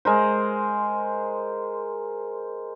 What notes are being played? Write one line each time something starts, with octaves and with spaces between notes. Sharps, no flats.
G#3 A#4 C5